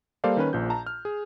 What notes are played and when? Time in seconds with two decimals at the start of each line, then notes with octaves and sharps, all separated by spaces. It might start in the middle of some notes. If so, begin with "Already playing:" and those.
0.24 G3 A#3 A4 C5 D5 F5
0.37 D#3 C#4 B4
0.53 A#1 A#2 F3 G6
0.70 A5 A#5
0.86 F6
1.05 G#4